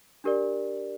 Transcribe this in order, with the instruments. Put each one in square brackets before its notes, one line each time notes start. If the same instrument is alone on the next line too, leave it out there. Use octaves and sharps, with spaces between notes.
[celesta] D4 G4 A#4 D5